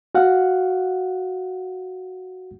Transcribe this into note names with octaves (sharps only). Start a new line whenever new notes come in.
F#4 F5 F#5